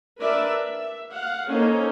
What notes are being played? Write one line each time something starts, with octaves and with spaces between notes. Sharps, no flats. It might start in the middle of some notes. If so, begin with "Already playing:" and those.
D4 A#4 B4 D5 E5
E5
F5 F#5
A#3 C#4 D#4 A4 C5 C#5